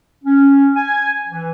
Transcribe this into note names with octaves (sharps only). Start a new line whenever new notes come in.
C#4
G#5
E3